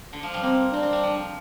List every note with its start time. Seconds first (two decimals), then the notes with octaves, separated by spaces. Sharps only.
0.13 D3
0.23 F3
0.34 G3
0.43 A#3 C4
0.72 C4 D4
0.83 C4
0.93 G3
1.03 F3